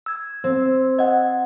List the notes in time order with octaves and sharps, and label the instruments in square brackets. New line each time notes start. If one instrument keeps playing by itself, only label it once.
[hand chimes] E6 G#6
[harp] C4
[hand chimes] D#5 F#5 [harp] G#6